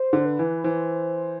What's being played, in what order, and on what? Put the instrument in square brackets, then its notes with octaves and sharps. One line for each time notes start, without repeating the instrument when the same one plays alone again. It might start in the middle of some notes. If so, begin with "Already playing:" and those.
Already playing: [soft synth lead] C5
[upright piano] D3
[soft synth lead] B4
[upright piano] E3
[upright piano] E3 [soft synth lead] C5